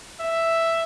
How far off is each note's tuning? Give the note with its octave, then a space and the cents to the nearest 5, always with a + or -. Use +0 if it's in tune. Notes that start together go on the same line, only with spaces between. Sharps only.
E5 +5